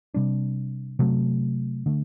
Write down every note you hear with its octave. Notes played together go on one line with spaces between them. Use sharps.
C3 G3 D4
C3 F#3 A3
D3 A3